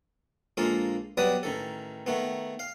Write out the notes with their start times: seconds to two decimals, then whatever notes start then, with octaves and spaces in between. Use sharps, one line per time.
0.57 A#1 G#3 A#3 F4 A4
1.17 F#3 G3 B3 B4 D5 D#6
1.43 A1 D#3 A4
2.07 D#3 A3 B3
2.59 F5